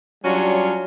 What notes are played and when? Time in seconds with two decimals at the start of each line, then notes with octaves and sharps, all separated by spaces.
0.25 F#3 G3 C#4 D4 F4